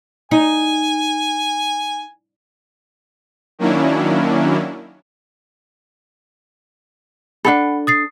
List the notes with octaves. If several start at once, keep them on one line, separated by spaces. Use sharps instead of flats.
D#4 G#5
D#3 F#3 A#3 C#4 D4 E4
D4 D#4 A4 F#5 B5
D#6 A6 C7